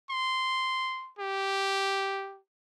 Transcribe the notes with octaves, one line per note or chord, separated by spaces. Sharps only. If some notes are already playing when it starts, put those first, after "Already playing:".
C6
G4